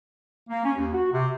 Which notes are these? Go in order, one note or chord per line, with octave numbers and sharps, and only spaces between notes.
A#3
C#4
D#2
F#4
C3